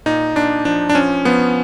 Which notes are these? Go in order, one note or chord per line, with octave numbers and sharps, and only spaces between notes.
A#2 D#4
A#2 D4
F3 D4
D4
F3 C#4
F3 B3